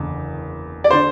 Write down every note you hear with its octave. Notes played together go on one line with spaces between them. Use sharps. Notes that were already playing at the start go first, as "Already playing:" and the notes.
Already playing: F#1 E2 D3
D5
D3 C5